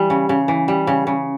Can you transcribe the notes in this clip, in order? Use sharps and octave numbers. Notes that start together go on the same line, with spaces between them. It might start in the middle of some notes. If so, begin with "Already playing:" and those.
Already playing: E3 G3
C#3
C#3
E3
G3
C#3
C#3